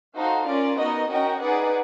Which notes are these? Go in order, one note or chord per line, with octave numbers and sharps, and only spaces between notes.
D#4 F#4 A4 C5 F5
C#4 F4 A#4 D5
B3 D#4 F#4 A#4 D#5
C#4 F#4 A#4 D#5 G5
D#4 G#4 B4 D5 F#5